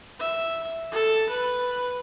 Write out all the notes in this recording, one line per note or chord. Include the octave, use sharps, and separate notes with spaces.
E5
A4
B4